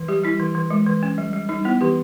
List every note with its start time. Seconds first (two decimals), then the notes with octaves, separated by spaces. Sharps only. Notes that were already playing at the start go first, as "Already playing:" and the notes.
Already playing: E3
0.08 G3 G4
0.24 G3 E4
0.40 E3
0.55 E3
0.70 G#3
0.86 E3
1.03 C#4
1.18 G3
1.33 G3
1.49 G3 D#4
1.65 B3 E4
1.81 E3 G4